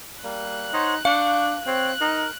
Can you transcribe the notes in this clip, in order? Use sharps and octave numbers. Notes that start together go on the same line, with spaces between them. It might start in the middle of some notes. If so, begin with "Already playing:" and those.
G3 A#3 F#6
D#4 C5 C#5 F#5
D4 F5 C#6 G6
C4 C#5 G5 F#6
D#4 A#4